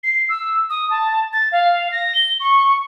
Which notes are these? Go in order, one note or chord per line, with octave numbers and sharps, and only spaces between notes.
C7
E6
D#6
A5
A6
F5
A#6
G7
C#6